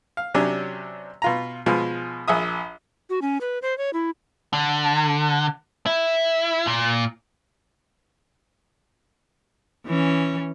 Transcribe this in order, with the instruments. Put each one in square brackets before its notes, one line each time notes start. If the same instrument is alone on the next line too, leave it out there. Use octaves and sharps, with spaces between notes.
[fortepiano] F5
C3 F#3 C#4 D4 G4
B2 F4 A#5
B2 F3 G#3
A#1 G#4 E5 D#6
[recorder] F#4
C#4
B4
C5
C#5
E4
[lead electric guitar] D3
E4
A#2
[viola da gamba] E3 C#4